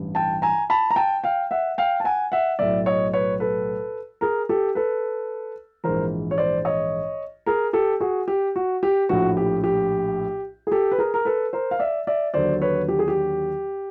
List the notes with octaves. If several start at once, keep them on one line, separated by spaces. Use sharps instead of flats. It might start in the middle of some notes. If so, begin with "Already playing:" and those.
Already playing: A1 G2 E3
G5 A5
G#5 A#5
A5 B5
A#5
G5 A5
F5 G5
E5 F#5
F5 G5
A5
F#5 G#5
E5 F#5
B1 A2 F#3 D5 E5
C#5 D#5
B4 C#5
A4 B4
G#4 A#4
G4 A4
A4 B4
A#1 G#2 E3 A#4 C5
C#5
C5 D5
C#5 D#5
G#4 A#4
G4 A4
F#4 G#4
G4
F#4
G4
A#1 A2 F3 F#4
G4
G4
G#4
G4 A4
B4
G#4 A#4
A#4
A4 B4
A#4 C5
F5
D5 E5
D5 E5
D#2 D3 F#3 C5 D5
B4 C#5
G4
G#4
G4